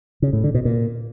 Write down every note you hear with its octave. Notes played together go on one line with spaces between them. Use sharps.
C#3
A2
D3
B2
A#2